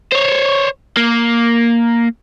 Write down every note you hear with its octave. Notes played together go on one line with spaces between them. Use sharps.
C5 C#5
A#3